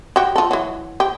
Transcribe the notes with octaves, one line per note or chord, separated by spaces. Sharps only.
F#4 G4
F4 A4
E3 F#3
G4